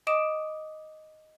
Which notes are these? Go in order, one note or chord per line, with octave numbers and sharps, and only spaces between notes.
D#5 D6 D#6 D7 E7